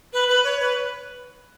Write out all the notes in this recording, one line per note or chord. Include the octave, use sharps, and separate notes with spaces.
B4
B4
C#5
B4